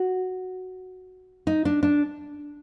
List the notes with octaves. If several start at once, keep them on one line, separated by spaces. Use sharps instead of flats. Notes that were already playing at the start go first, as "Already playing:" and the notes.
Already playing: F#4
D#4
D4
D4